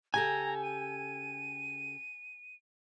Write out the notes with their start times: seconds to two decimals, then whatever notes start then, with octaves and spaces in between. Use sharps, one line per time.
0.14 C#3 G4 A4 G#5 A#5
0.63 D#7